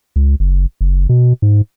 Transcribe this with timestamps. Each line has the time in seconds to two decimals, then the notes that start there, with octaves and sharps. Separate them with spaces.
0.16 C#2
0.40 F#1
0.81 F#1
1.09 B2
1.42 G#2